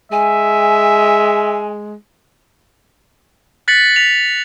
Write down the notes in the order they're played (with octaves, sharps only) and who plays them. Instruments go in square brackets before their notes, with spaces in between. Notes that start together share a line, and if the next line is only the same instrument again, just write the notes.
[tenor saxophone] G#3 [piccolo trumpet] E5 [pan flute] G#5
[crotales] F#6 A6 B6 C#7 F#7
B6 F7